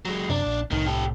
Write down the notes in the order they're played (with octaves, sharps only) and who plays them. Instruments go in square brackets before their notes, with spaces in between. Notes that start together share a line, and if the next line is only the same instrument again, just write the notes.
[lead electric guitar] F#3 G#3
[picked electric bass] F#2 C3 [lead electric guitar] D4
[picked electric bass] A#1
[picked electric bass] C2 A2 [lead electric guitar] D#3
[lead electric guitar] G4 A4